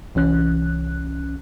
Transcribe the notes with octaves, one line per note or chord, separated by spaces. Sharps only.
C2 E3 C#4 F#6